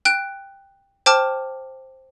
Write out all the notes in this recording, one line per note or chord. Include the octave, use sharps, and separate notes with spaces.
G5 F#6 D7
C5 G5 A5 D6 F6 E7